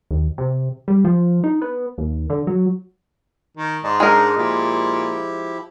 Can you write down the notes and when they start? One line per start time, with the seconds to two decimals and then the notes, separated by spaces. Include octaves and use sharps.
0.11 D#2
0.38 C3
0.88 G3
1.05 F3
1.44 D#4
1.62 B3
1.98 D#2
2.30 D3
2.47 F#3
3.57 D#3
3.84 G#2 D5 D#5 A5
4.00 G#3 D4 D#4 G#4 A#4
4.38 A#2 F3 E4 G4